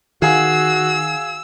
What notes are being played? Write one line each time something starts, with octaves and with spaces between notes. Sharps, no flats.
D#3 F#4 G#4 F5 G#5 E6